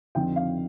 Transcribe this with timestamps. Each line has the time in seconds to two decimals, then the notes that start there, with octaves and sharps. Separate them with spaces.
0.15 F2 D3 F3 C4 D#4 G5
0.36 F5